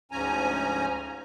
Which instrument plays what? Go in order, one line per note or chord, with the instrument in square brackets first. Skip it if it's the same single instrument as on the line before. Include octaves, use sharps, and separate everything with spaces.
[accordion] D2 G#2 F3 C#4 G#5 A#5